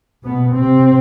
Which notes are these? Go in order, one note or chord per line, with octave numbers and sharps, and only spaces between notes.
B2 B3
C3 C4